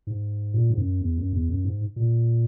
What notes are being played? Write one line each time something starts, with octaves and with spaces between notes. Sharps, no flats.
G#2
A#2
G#2
F#2
E2
F#2
E2
F#2
G#2
A#2